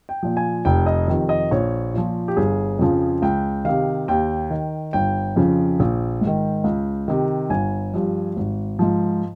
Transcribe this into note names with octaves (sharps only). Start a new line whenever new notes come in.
G5
A#2 F3
G#5
F1 G5
D#5
F2 C3 D#3
D#5
A#1 C#5
A#2 F3
G4
G1 G#4
F2 C#3 F3
C#2 G5
C3 D#3 F5
D#2 G5
D#3
G1 G5
F2 C#3 F3
A#1
G#2
D#3
C#2
C3 D#3
G1 G#5
G2 F3
G#1
G#2 F3